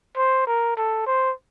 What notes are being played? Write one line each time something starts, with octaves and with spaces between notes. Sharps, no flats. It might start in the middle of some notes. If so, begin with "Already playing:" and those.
C5
A#4
A4
C5